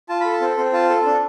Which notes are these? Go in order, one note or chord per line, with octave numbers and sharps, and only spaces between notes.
F4 A5
A4 B5
A5
C4
C4
F4 A5
A4
D4